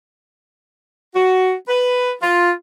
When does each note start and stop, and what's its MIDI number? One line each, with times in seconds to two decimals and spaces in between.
1.15 1.53 66
1.68 2.12 71
2.22 2.51 65